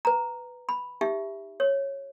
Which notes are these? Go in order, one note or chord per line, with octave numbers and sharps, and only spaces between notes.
B4 A#5
B5
D#4 G4 E5
C#5